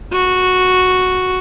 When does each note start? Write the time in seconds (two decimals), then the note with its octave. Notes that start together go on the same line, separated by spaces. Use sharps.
0.13 F#4